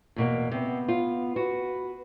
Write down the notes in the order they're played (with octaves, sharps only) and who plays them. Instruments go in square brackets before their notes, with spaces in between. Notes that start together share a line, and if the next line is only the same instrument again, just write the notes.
[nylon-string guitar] E2 B2 A#3
[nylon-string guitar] C3 [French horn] B3
[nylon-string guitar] F4
[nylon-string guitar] F#4 [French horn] B4